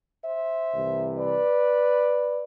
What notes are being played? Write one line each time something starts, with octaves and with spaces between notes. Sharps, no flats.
C5 E5
C2 C3 E3
B4 D5